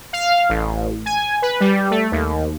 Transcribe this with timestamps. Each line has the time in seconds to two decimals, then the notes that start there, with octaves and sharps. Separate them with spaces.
0.13 F5
0.49 A1
1.06 G#5
1.42 B4
1.60 G3
1.91 A3
2.12 D#2